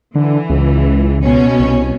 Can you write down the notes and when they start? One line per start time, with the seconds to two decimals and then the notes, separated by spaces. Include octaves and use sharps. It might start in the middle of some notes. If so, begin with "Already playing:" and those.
0.15 D3 E3
0.50 C#2
1.24 B2 C#4
1.60 C2